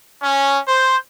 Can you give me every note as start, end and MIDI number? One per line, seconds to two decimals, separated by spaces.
0.23 0.59 61
0.68 0.97 72